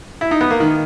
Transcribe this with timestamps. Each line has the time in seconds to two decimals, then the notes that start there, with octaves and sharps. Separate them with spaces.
0.21 E4
0.31 D#4
0.41 B3
0.50 A#3
0.60 D#3